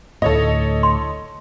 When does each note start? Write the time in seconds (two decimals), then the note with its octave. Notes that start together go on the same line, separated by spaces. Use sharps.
0.22 D2 A2 A4 C#5 D#5
0.83 C6